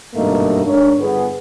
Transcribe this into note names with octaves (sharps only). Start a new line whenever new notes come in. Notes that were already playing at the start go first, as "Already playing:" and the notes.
G#1 G2 B2 A3 A#3 D#4
G#2 D4 A#4 C#5
G1 B3 G#4